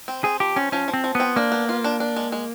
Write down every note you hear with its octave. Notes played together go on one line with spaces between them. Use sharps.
C4
C4 G#4
F3 G4
C4 C#4
F3 C#4
F3
C4
F3
B3 C4
A#3 D4
B3
F4
D4
D4
G#3
G#3